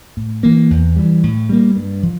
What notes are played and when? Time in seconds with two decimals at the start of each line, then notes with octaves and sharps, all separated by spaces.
0.17 A2
0.43 E3 A#3
0.70 E2
0.96 E3 G3
1.23 A2
1.49 G3 A#3
1.76 G2
2.03 F3